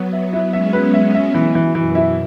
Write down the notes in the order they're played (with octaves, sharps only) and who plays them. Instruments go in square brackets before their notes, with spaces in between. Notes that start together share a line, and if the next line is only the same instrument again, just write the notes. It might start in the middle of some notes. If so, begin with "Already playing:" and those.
Already playing: [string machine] F#3 B3
[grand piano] E5
E4
[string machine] G#3 C#4 [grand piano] E5
[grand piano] B4
E5
E5
[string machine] B2 [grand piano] E3
[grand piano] E3
[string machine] F#2 [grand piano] E3
[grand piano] E4